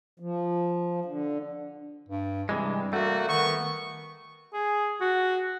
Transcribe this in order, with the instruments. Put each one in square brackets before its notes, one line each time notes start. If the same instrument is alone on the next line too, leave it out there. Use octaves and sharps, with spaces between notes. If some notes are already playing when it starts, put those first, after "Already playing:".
[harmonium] F3
D3
[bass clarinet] G2
[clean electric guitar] C3 E3 G#3 [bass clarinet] G3
[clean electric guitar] A3 [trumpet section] A#3 F#4
[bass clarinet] D#3 [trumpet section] B3 C#6
[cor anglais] G#4
F#4